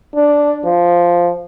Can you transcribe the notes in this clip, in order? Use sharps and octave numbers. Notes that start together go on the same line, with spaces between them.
D4
F3